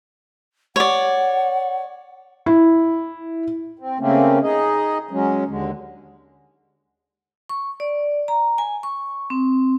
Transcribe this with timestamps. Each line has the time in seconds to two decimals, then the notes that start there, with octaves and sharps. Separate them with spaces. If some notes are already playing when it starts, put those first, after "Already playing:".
0.76 C#5 D5 F#5
2.46 E4
3.79 C4
4.00 C#3 A3 A#3 C4 C#4
4.43 D#4 G#4 D#5
5.11 F#3 G#3 C#4
5.48 D#2 D3 G#3
7.49 C#6
7.80 D5
8.28 A#5
8.58 G#5
8.83 C#6
9.30 C4